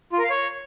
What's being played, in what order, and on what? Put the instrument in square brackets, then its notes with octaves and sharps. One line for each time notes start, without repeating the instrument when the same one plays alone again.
[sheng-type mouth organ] F4
A#4
F5
C#5